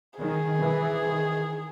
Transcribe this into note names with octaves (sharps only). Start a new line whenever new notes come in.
D#3 G#4
E3
D#3